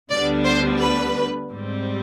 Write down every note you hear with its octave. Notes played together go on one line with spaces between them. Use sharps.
D2 D3 G3 B3 D4 D5
C5
B4
G#2 G3 C4